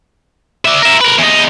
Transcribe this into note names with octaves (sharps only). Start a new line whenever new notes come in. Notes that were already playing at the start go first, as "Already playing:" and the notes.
D4 E5
A#4 E5
A#4 B4
E2 D#4